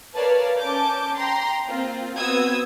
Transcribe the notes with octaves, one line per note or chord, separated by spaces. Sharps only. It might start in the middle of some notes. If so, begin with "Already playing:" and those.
A#4 B4 C#5 D5 F5 A5
C#4 A5 D6 G6
G5 A#5 C6
A#3 C4 F4
B3 C4 F#4 D#6 E6 G#6